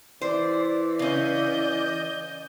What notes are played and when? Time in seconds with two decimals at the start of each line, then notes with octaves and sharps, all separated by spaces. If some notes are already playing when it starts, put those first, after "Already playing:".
0.21 E3 C5 D5
0.99 C#3 C#4 D5 D#5 G6